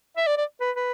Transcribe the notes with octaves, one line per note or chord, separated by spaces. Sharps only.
E5
D5
D5
B4
B4